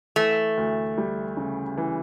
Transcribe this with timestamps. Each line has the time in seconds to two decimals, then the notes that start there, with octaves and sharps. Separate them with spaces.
0.16 E3 A3
0.57 D2
0.98 G3
1.37 C#3
1.78 E3